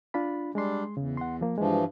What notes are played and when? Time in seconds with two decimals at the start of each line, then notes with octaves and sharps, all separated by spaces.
0.14 D4 F4 B5
0.55 G3 G#3 D4 C6
0.97 E2 C#3
1.17 F#5 C6
1.41 F3 A#3
1.58 G2 E3 F3 G#3